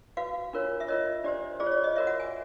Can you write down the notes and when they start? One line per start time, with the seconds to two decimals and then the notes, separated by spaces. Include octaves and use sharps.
0.17 F#4 B4 F5
0.53 D4 F4 A#4 C#5
0.80 E5
0.88 F4 A#4 C#5 D#5
1.24 D4 G4 C5 D5
1.60 F4 G#4 C5 D5
1.66 C#5
1.72 D5
1.84 D#5
1.96 F#4 A#4 C#5 E5
2.07 F#5
2.20 G#5